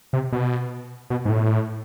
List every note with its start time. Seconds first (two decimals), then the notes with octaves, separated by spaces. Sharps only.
0.13 C3
0.33 B2
1.10 B2
1.25 G#2
1.30 A2